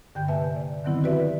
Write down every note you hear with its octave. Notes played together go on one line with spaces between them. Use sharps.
G2 D3 G5 G6
C3 A#3 B4 E5 G#5 A5
D5
D3 D#3 F#3 B3 C4 E4
F#4 G4 B4 D5 E5